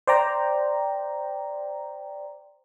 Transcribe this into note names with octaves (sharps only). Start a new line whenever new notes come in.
C5 D5 G5 A#5